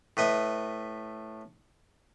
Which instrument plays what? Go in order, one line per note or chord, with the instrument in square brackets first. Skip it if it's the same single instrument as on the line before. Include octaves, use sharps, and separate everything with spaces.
[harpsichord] A2 B4 D#5 E5